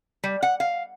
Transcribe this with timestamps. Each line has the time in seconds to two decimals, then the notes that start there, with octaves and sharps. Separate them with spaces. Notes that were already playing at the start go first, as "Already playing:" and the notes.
0.24 G3
0.43 F#5
0.60 F5